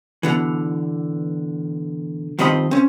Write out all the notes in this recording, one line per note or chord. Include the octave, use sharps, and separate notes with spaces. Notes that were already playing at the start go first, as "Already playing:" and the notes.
B2 D3 E3
G2 D#3 F3 C4 D#5 B5
C4 C#4